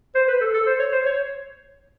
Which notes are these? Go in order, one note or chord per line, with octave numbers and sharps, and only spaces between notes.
C5
B4
A4
A4
C5
C#5
C5
C#5